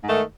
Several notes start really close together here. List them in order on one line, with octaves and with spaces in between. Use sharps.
G#2 A3 D#3